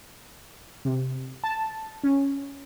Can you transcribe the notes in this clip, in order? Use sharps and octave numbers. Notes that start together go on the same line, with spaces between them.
C3
A5
C#4